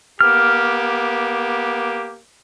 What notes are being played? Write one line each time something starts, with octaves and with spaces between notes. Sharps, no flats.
A#3 B3 G4 F6